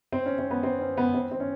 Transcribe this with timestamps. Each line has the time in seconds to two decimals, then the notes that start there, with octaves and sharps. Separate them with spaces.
0.13 C4
0.26 C#4
0.39 C4
0.51 B3
0.63 C4
0.81 C#4
0.97 B3
1.14 C4
1.32 C4
1.40 C#4